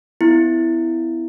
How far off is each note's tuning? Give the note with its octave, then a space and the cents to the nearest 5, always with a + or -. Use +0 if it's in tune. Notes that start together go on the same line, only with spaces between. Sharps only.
B3 +35 E4 +0